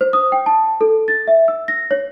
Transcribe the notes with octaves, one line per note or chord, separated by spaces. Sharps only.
C5
D#6
G5
A5
A4
A6
E5
E6
A#6
C#5